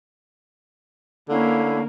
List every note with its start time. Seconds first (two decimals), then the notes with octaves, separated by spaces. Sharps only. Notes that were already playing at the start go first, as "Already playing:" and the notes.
1.29 D3 A#3 C#4 E4 F5